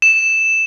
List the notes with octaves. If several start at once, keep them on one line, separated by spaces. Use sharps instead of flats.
E7